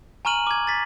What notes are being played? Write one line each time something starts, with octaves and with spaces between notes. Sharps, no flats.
G#5 A#5 C#6 F6 D#7 F#7
D6 G#6
A6 B6